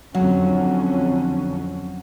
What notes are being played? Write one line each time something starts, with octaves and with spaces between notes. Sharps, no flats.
F2 D3 F#3 C#4